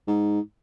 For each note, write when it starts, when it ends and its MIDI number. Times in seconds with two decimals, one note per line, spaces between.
0.08 0.40 44